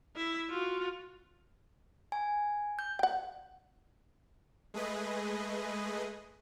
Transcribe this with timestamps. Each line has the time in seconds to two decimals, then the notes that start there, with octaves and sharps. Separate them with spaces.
0.16 E4 E5
0.50 F4 F#4
2.12 G#5
2.79 G6
2.99 F#5 G5
4.74 G#3 A3 G#4 B4 D#5